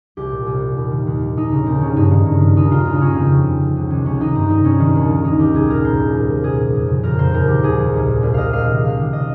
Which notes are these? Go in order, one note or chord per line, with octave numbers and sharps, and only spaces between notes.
C2 G4
A#2
C2
A#2
D#2
D#3
D#2
D#3
D#2 D#4
C#3
D#2 C4
C#3 C#4
G2 D#4
D#3
G2
D#3
D#2 D#4
C#3 F4
D#2 F4
D#4
C#3 C#4
F2 C4
C#3
F2
C#3
C#2
C3 D#3 C#4
C#2 C#4
C3 D#3 D#4
G2 C4
D#3 D#4
G2 C#4
D#3
D#2
D#3
D#2 D#4
D#3 G4
C2 G#4
A#2 A#4
C2 C5
A#2
C2
A#2
C2 G#4
A#2
F2
C#3
F2 A#4
C#3 C5
D#2 A#4
D#3 G4
D#2 G#4
D#3
C2
A#2
C2
A#2 D#5 F5
C#2 F5
C3 D#3
C#2 F5
C3 D#3
D#5